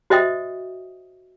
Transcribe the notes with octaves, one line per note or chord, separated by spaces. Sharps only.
F#4 C5 D#5 E5 G5 D#6